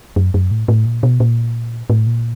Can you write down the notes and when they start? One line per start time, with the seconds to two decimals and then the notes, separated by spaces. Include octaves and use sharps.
0.16 F#2
0.34 F#2
0.51 A2
0.68 A2
0.86 A#2
1.03 B2
1.20 A#2
1.90 A2
2.07 A#2